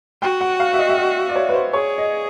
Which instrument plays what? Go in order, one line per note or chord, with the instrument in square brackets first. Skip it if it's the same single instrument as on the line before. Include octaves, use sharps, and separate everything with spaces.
[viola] F#4 [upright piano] G5
[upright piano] F#5
F5
E5
D#5
E5
D#5
D5
C#5
B4
C5
[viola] G#4 [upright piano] C#5
[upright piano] D#5